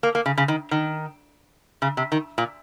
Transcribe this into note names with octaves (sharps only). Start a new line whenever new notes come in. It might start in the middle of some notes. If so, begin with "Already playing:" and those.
A#3
A#3
C#3
C#3
D#3
D#3
C#3
C3
D#3
A#2